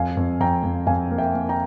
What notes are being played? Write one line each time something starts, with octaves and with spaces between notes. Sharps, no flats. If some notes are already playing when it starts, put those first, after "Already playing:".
Already playing: F2 F5 G#5
F2
F2 G5 A#5
F2
F2 F5 G#5
A#3
E5 G5
A#3
G5 A#5